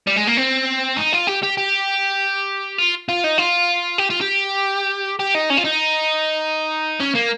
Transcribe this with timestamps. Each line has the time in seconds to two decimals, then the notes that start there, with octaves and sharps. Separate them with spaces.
0.07 G3
0.16 G#3
0.27 A#3
0.37 C4
0.97 D#4
1.13 F4
1.27 G4
1.43 G4
1.57 G4
2.78 F4
3.09 F4
3.24 D#4
3.38 F4
3.98 G4
4.10 F4
4.21 G4
5.19 G4
5.34 D#4
5.50 C#4
5.58 F4
5.65 D#4
7.00 C#4
7.15 A#3